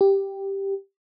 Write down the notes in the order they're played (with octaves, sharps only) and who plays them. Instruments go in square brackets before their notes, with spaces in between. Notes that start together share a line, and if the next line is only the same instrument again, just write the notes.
[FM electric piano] G4